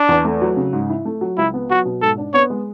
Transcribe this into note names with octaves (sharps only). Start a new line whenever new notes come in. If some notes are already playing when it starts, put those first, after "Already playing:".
Already playing: D4
E2
A3
F#3
C#3
G#2
E4
A3
F#3
C#2 E4
B3
F#3 F#4
B2
G#2 A4
D4
B3 C#5
G#3